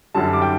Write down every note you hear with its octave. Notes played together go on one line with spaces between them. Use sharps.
F#2 D3 G3 A5
D6
G5